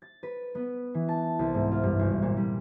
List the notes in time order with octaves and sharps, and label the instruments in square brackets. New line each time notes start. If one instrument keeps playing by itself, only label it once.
[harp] A6
B4
B3
E3
A5
C2
G#2
F4
G2
G#1
A#2
G3